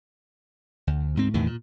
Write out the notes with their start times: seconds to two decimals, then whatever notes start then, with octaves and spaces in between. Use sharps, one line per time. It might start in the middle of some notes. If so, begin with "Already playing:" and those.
0.87 D2
1.15 D2 G#2 C4
1.34 E2 A2 C3 D#3
1.47 A#2